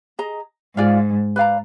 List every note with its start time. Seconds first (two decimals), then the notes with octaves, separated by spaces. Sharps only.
0.19 G#4 D#5 A#5
0.77 G#2 F4 G#4 D5 F5
1.36 B4 D5 F5 A#5